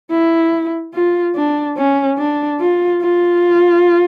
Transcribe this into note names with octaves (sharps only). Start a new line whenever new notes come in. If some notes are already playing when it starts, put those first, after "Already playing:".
E4
F4
D4
C#4
D4
F4
F4